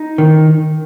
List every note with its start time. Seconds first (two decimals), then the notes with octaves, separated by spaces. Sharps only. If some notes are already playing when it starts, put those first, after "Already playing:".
Already playing: D#4
0.18 D#3